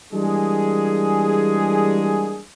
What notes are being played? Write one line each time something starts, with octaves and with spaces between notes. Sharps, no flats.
E3 G3 G#3 A#3 D4 G#4